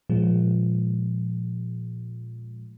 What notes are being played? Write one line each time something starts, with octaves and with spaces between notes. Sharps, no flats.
A#2 F3 G#3